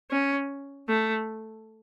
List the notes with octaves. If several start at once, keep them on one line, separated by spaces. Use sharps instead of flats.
C#4
A3